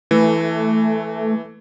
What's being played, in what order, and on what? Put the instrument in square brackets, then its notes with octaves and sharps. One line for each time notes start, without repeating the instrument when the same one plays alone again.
[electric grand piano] E3 [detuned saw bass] A3